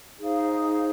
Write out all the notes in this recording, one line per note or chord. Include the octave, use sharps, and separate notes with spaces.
D#4 G#4 C5 F5